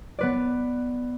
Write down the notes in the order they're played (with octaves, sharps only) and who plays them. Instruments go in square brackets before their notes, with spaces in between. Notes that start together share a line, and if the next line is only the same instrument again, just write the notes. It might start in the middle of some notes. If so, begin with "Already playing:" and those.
[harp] B3 B4 D5